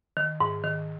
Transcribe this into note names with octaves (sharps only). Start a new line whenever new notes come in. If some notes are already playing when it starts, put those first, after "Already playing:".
D#3
G#2
D#3